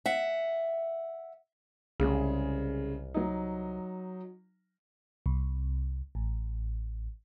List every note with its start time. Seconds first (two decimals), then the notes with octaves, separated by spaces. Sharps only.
0.06 E5 F#5
2.00 C2 C#3 G#3
3.14 F#3 D#4
5.26 C2
6.15 A1